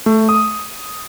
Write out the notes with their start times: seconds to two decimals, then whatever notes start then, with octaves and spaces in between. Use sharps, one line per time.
0.06 A3
0.29 D#6